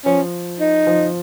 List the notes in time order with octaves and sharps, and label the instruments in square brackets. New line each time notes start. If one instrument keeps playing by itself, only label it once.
[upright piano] F3 [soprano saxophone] C#4
[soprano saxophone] D#4
[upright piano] F3